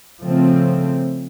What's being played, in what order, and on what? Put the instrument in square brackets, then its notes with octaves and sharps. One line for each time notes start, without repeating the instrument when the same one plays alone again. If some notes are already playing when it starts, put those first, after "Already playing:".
[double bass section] C#3 F3 A3 C4